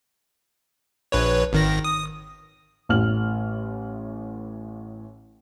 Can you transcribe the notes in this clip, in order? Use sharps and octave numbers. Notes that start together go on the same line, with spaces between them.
A#1 B4 C#5
G#1 D#3 A#6
D#6
A1 A2 F6 F#7